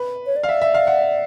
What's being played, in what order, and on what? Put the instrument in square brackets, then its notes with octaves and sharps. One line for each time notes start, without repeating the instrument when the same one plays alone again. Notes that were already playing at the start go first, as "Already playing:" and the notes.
Already playing: [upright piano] B4
[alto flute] C#5
D5
[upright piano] F5
E5
E5
F5
F#5